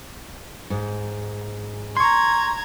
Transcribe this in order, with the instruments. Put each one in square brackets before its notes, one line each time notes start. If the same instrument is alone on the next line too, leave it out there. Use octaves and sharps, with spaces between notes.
[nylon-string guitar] G#2
[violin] A#5 G#6 [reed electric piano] C6 C#6